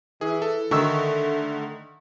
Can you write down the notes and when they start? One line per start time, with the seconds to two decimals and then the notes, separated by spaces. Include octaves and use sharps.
0.21 E3 G#4
0.42 A4
0.71 D3 D#3 A3 C#6 E6